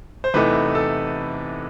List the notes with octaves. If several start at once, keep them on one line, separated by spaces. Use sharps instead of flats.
C5
E2 C3 E3 A3 D#4 B4
A4